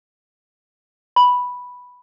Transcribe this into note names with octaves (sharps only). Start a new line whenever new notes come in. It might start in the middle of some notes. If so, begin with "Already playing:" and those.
B5